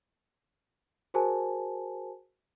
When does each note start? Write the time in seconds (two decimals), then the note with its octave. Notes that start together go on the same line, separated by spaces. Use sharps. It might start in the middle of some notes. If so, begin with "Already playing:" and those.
1.14 F#4 G#4 A#4 C5 G#5 A5